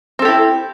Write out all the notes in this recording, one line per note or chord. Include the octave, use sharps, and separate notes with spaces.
C4 E4 G4 A4